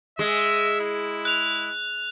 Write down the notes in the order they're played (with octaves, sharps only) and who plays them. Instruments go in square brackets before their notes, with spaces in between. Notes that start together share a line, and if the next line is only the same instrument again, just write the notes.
[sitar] G#3 [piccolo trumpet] E5
[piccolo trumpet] E4
[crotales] F#6 F7